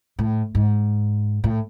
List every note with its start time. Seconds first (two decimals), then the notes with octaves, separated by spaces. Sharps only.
0.19 A2
0.55 G#2
1.44 A2